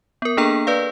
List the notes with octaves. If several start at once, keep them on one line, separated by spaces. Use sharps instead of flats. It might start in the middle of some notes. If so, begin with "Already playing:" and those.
B3 A#4
A#3 D4 G#4 A4 A#5
B4 D5 F5